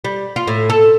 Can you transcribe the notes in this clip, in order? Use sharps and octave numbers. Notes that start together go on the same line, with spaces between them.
G3
F4
A2
A4